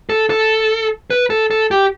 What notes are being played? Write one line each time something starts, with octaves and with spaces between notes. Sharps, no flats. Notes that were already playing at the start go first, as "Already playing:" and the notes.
A4
A4
B4
A4
A4
G4